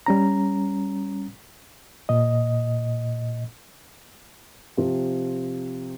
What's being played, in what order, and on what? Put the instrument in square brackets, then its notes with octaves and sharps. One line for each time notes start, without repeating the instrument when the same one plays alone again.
[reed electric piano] G3 C#4 A#5
A#2 D#5
[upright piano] C3 F3